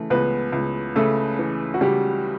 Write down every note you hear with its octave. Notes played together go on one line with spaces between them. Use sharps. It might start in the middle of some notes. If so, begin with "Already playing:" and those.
Already playing: C#3 E3 A3
C#2 B3 B4
C#2
C#3 A3 A4
E3
F#4
C#2 G3 G4